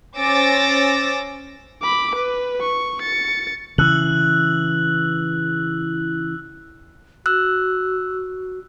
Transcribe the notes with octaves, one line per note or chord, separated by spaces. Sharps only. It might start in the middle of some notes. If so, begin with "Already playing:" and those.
C#4 C5 D6 E6 A6 A#6
B5 D6
B4
C#6
A6 C#7
C#3 E3 E6 F#6 F#7
F#4 E6 F#6